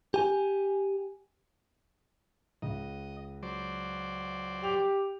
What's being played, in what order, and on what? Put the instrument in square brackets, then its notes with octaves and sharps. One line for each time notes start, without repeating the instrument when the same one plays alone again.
[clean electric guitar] G4 G#5
[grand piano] C#2 [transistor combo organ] D#5
[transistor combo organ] F#3 C5 D5
[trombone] G4 [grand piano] F7